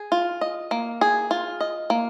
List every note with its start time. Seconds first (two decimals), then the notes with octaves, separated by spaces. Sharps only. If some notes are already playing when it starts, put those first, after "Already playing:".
Already playing: G#4
0.12 F4
0.41 D#5
0.71 A#3
1.01 G#4
1.31 F4
1.61 D#5
1.90 A#3